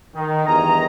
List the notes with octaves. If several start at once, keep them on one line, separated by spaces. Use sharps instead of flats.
D#3
E2 G2 D#3 D#5 G#5 A#5